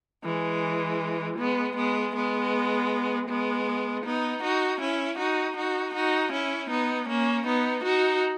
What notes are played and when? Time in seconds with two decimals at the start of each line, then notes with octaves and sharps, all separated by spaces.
0.25 E3 G#3
1.39 G#3 B3
1.77 G#3 B3
2.15 G#3 B3
3.29 G#3 B3
4.04 B3 D#4
4.43 D#4 F#4
4.80 C#4 E4
5.19 D#4 F#4
5.57 D#4 F#4
5.94 D#4 F#4
6.32 C#4 E4
6.71 B3 D#4
7.08 A#3 C#4
7.46 B3 D#4
7.84 D#4 F#4